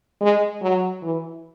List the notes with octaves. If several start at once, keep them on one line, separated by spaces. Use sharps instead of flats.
G#3
F#3
E3